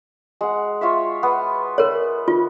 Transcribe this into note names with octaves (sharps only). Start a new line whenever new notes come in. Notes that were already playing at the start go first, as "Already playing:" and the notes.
G#3 F#5
F4 C#5 E5
B3
A#4 C#5
F4